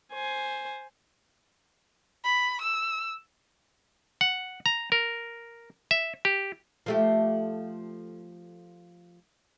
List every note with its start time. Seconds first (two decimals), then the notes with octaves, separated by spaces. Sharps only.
0.13 C5 G#5
2.24 B5
2.61 E6
4.21 F#5
4.66 A#5
4.92 A#4
5.91 E5
6.25 G4
6.86 F3 A3 G4